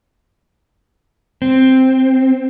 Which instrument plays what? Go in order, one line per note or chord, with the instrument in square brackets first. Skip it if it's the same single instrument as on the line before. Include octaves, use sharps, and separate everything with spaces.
[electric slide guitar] C4